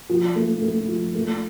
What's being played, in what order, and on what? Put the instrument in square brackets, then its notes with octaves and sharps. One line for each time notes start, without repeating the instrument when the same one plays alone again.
[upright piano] F3
A3
A3
F3
A3